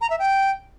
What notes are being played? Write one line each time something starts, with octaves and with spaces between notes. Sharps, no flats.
A#5
E5
G5